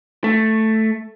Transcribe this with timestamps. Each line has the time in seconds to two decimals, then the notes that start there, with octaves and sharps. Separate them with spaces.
0.24 A3